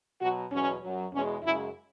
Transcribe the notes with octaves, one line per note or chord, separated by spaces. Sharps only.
B2 F#3 F#4
E2 B2 F#3 C#4
F#2 F#3
E2 B2 G#3 C#4
F#2 C#3 G#3 E4